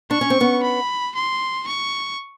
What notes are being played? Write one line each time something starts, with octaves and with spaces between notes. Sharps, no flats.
D4 C#6
C#4
C4
B3 C#4
B5
C6
C#6